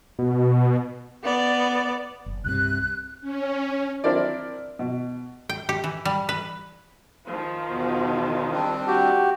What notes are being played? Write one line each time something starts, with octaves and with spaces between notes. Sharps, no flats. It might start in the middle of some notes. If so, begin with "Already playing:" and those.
B2
B3 D5
F#1
C2 G2 C3 F#6
C#4
C4 D4 E4 A#4 C5 D5
B2
G5
G4
E3
G3
B4
D#3 F3
E2 B2
G3 C4 D4
F#4 G4